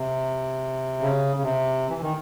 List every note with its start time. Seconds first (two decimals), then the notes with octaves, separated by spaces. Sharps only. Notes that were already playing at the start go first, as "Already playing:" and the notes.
Already playing: C3
1.01 C#3
1.36 C#3
1.43 C3
1.90 E3
2.01 D#3